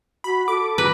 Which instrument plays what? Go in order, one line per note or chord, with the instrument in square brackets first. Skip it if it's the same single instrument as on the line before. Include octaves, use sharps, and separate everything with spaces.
[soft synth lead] F#4 [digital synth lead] B5
[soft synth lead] A4 [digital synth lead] D6
[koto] B4 [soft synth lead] A#5